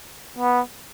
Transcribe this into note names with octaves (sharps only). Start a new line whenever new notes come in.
B3